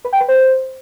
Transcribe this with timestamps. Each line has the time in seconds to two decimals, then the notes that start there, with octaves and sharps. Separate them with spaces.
0.05 B4
0.13 G5
0.20 B4
0.28 C5